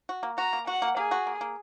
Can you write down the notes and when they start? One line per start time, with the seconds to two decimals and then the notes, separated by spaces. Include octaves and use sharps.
0.09 F#4
0.23 A#3
0.38 F#4 A#5
0.53 A#3
0.67 F#4 F#5
0.82 A#3
0.97 A#3 G#4
1.11 F#4
1.27 A#3
1.41 A#3